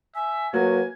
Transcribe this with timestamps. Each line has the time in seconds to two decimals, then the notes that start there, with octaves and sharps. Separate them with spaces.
0.15 E5 G#5
0.53 F#3 A#3 F#4 B4 G#5